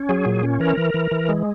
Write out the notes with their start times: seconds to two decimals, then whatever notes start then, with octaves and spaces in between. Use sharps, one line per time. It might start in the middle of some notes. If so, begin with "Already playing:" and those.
Already playing: C#4
0.09 F#3 G#4
0.26 A#2
0.43 C#4
0.60 E3 A#4
0.77 E3
0.94 E3
1.11 E3
1.29 G#3